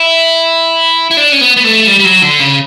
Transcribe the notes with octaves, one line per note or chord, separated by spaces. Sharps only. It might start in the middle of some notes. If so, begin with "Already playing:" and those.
Already playing: E4
E4
D4
C#4
B3
B3
A3
G3
G3
F#3
D3
C#3